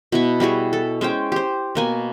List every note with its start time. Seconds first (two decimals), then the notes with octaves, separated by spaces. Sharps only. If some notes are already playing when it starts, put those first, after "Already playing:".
0.12 B2 E4 C#6
0.40 G3 E4 F#4 G#4
0.73 A4
1.01 G#3 C#4 C5 G5
1.32 G4 C5
1.75 B2 A#3 G#5